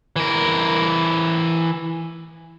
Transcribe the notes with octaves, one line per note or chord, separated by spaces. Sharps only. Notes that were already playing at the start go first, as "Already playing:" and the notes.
E3 A#4